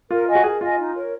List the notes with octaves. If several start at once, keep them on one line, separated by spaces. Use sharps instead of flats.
F4 A#4
D#5 G#5
F#4
G#4 A#4
F4 D#5 G#5
D#4
A#4 C#5